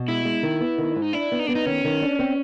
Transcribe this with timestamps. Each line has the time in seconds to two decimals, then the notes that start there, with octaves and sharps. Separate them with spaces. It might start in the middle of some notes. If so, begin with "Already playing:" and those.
Already playing: B2
0.08 G#3 E4
0.25 G#3
0.43 D#3
0.60 B3
0.78 D#3
0.95 G#2
1.02 D#4
1.13 D4 E4
1.32 B3
1.39 D#4
1.47 B3 D4
1.55 D#4
1.66 D#3 C#4
1.84 D#3
2.02 D4
2.19 C4